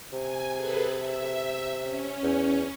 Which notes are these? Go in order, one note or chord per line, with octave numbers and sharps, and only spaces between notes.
C3 G#5
G#4 A4 B4
E5
C#4
E2